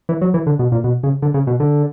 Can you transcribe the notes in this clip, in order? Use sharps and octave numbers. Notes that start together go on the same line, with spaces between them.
E3
F#3
E3
D3
B2
A#2
B2
C#3
D3
C#3
B2
D3